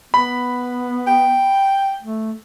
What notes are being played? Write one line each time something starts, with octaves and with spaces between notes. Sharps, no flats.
B3 B5
G5
A3